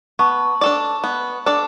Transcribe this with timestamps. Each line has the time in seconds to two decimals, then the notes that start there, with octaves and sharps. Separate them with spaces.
0.19 B3 A5 C#6
0.61 D4 A4 D5
1.04 B3
1.46 D4 A4 D5